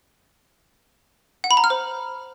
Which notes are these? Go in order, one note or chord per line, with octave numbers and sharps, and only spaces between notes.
F#5
B5
A#5
F6
C5